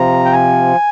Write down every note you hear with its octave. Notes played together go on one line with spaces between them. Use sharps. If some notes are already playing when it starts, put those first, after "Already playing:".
Already playing: C3 F3 A#5
G5
G#5